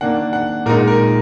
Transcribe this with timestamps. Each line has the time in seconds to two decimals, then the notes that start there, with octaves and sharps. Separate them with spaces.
0.01 D#3 A#3 D4 F#5
0.33 F#5
0.66 A#2 G#3 D#4 A#4
0.87 A#4